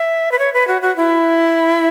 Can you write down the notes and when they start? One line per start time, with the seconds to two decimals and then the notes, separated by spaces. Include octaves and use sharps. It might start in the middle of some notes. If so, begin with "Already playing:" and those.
Already playing: E5
0.32 B4
0.39 C#5
0.54 B4
0.68 F#4
0.82 F#4
0.96 E4